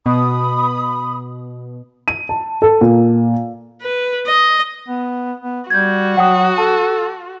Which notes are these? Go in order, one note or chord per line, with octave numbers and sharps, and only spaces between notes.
B2 B5 D#6
D#7
A5
A4
A#2
B4
D#5
B3
B3
G3 F#4 G6 G#6
F#3 F#5 G5 D#6
A4 A5